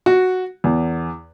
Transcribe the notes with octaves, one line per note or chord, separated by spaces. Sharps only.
F#4
E2